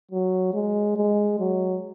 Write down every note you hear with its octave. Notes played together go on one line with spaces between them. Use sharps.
F#3
G#3
G#3
F#3